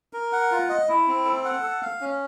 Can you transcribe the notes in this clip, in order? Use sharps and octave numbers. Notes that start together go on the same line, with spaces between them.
A#4
F#5
F4
D#5
E4
C4
A4
F#5
A4
F5
C#4